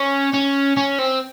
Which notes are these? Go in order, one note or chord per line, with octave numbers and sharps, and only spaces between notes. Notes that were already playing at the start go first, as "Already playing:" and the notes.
Already playing: C#4
C#4
C#4
C4